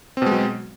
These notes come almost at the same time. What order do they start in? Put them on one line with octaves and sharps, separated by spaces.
C4 B2 G#3 F#3